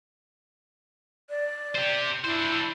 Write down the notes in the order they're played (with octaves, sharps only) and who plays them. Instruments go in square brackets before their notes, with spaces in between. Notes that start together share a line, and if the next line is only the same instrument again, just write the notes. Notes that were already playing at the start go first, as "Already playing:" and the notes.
[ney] D5
[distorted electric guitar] G4 C5
[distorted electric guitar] D4 C5 [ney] E4